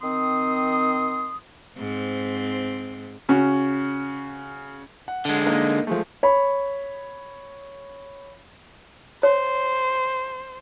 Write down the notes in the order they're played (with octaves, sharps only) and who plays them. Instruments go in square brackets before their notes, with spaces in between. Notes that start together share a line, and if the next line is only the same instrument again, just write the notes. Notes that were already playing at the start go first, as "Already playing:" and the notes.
[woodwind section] D#3 C4 C6 D#6
[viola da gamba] G#2 C4
[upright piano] C#3 C#4 F#4
[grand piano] F#5
[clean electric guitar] D3 G#3
[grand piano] A#3 D#4 A#4
F3 G#3 A3
C#5 B5
[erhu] C5 [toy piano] C#5